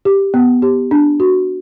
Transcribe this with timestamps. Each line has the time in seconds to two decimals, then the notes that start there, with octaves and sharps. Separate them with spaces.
0.05 G4
0.34 B3
0.62 G4
0.91 D4
1.20 F#4